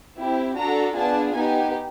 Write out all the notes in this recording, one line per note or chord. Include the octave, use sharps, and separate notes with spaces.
C4 E4 G4
D4 F#4 A4 A#5
B3 D4 F4 G#4 A5
B3 D#4 G4 G#5